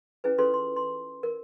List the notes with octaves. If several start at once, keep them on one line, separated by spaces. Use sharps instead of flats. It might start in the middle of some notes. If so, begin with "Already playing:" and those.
C#4 E4 G#4 B4
C#4 F4 G#4 A4 B4 C6
C6
C6
A#4